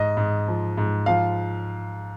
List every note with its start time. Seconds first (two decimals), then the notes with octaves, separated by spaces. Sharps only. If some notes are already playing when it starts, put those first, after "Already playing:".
Already playing: G#2 D#5
0.17 G#2
0.48 F3
0.78 G#2
1.06 F3 F5